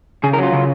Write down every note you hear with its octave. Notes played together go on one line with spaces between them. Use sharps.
C#3 G#4
A#4
F#3 F4
C#3